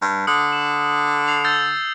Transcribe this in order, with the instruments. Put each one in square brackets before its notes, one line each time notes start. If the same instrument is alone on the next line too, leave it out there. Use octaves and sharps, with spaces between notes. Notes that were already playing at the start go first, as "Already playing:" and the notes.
[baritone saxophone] G2
[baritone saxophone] D3 [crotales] D#6
[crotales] E7
D#6 C7 F7
E6 G6 A6